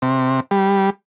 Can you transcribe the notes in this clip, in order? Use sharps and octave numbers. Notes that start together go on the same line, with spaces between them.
C3
G3